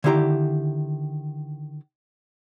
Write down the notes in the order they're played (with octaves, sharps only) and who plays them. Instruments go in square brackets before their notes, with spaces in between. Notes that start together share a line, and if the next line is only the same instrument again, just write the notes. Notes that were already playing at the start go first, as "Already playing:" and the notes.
[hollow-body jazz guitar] D3 D#3 E4 G4 A#5